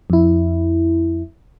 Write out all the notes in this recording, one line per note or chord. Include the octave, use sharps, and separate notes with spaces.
F2 E4